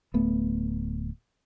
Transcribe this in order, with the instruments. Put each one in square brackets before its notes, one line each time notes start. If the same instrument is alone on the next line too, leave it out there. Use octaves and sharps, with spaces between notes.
[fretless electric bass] D1 A3 B3